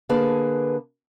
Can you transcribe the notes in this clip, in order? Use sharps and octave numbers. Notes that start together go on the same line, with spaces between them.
D3 A#3 G#4 B4 A5